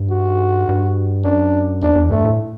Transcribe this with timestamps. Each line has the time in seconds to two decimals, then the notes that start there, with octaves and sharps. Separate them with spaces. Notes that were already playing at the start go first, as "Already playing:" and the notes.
Already playing: G2
0.11 F#4
0.69 G2
1.24 F#2 D4
1.82 E2 D4
1.95 E2
2.10 G2 A3
2.25 A2